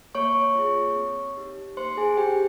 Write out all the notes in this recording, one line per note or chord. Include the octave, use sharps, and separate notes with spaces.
A#3 C#5 C#6
F4 G#4
C4
D#4 G4
A#3 C5 C6
G#4 G#5
D#4 G4 G#4 G5